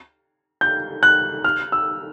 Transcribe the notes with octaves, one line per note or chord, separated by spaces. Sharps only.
G6
F#6
F6
E6